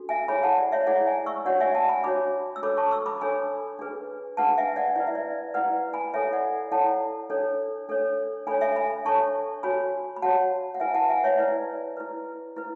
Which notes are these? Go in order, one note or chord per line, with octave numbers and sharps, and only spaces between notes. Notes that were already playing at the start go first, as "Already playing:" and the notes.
Already playing: D4 F#4 A4
E5 G#5
E4 G#4 C#5 G#5 B5
F#5 A5
D5
C#5 E5
E4 G#4 C#5 D5 F#5
E5 G#5
C#6 E6
D4 F#4 C#5 D5 F#5
E5 G#5
F#5 A5
G#5 B5
D4 F#4 C#5 B5 D6
E6
D4 A4 C#5 B5 D6
A5 C#6
C#6 E6
B5 D6
D4 A4 C#5 G#5 B5
D4 G#4 B4
D4 G#4 B4 F#5 A5
E5 G#5
D5 F#5
E4 B4 D5
E5
D5
E4 B4 D5 F#5
G#5 B5
E4 A4 C#5 E5 G#5
D5 F#5
E4 A4 C#5 F#5 A5
D4 A4 C#5
D4 A4 C#5
D4 A4 C#5 G#5 B5
E5 G#5
G#5 B5
D4 A4 C#5 A5 C#6
F#4 C#5 G#5 B5
B5
F#4 C#5 F#5 A5
F#5
E4 B4 E5 G#5
F#5 A5
E5 G#5
F#5
C#5 E5
E4 B4 D5
E4 B4
E4 B4